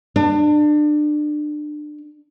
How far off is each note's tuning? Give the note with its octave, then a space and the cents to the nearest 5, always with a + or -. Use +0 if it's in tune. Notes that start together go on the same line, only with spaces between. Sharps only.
D4 +30